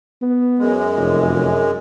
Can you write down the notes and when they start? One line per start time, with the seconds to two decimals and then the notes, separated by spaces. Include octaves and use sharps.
0.22 B3
0.59 F#2 G#3
0.97 F1